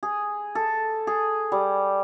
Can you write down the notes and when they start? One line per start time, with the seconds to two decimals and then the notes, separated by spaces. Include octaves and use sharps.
0.03 G#4
0.55 A4
1.07 G#4
1.52 G3